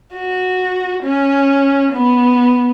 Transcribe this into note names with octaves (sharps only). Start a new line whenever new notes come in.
F#4
C#4
B3